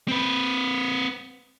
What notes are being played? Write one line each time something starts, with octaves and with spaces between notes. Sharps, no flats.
C4 B4